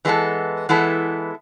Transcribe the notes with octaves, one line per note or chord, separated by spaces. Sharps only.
E3 G#3 B3 E4 A4
E3 G#3 B3 E4 A4